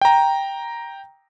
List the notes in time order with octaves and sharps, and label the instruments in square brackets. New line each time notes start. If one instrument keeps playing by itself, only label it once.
[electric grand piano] G5 A#5